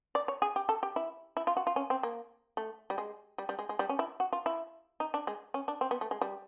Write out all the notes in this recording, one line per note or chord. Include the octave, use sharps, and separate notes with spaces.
D5
C#5
G#4
G4
A4
G4
E4
E4
F4
F#4
F4
C#4
C4
A#3
A3
G3
G#3
G3
G3
G#3
G#3
G3
C#4
E4
F#4
F4
E4
D#4
D4
G#3
C#4
D4
C4
B3
A3
G#3
G3